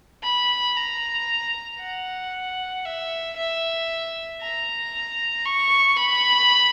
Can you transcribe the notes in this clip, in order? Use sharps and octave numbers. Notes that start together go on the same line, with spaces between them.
B5
A#5
F#5
E5
E5
A#5
C#6
B5